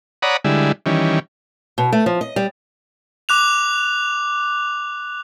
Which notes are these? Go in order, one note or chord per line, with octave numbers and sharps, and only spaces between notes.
C#5 D5 F#5 A#5 B5 D#6
D3 G3 G#3 E4
D#3 E3 G3 C#4
B2
A3
F3
D#5
G3
D6 F#6 F7